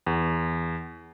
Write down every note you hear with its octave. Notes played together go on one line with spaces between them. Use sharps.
E2